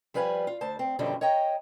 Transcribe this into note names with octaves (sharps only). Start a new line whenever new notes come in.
F3 G3 B4 F5 G#5
F4
D2 C5 A5
C4
F#2 B2 D3 D#3 F3 G3
C#5 D#5 G5 A#5